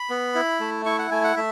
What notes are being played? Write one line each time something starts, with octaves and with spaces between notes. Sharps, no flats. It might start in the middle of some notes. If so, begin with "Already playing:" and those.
Already playing: B5
B3
E4
A3
E4 C#6
F#5
A3 G#5
F#5
A3 E5